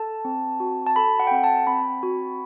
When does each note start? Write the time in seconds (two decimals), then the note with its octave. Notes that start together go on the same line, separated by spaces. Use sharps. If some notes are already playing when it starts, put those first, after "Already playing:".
Already playing: A4 A5
0.25 C4
0.60 F#4
0.87 A5
0.96 A4 B5
1.20 F#5
1.27 G5
1.31 C4 F#5
1.44 A5
1.67 C4 B5
2.03 F#4